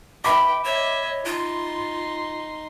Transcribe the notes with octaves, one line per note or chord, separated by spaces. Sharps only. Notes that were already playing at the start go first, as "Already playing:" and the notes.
B4 E5 G5 B5 D6
C#5 D#5 E5
D#4 F4 C6